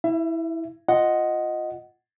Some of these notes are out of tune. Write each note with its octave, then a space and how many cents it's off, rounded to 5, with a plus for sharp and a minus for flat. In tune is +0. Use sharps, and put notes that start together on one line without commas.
E4 -10 E5 +35
F4 +0 D#5 +0 F#5 +0